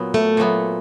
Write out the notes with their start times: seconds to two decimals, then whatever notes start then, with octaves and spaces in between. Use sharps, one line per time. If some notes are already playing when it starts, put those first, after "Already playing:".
Already playing: A#2 F#3 B3
0.14 A3
0.37 A#2 F#3 B3